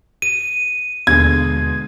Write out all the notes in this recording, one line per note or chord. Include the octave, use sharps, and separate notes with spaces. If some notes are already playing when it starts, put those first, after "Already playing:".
D#7
D#2 B2 D3 G#3 G#6